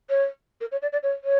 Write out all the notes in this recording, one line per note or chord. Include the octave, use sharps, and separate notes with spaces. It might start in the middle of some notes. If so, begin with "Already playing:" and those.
C#5
A#4
C#5
D5
D5
C#5
C#5